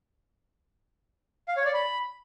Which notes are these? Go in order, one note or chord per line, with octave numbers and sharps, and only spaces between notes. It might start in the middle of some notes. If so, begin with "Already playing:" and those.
F5
C#5
D5
B5